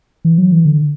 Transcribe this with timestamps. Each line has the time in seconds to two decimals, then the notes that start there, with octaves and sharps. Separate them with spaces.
0.25 E3
0.38 F#3
0.52 E3
0.65 D3